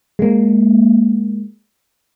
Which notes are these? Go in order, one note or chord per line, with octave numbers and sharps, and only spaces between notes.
G#3 A#3